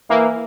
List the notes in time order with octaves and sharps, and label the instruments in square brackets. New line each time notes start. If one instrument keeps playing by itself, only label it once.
[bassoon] E3 [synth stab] A#3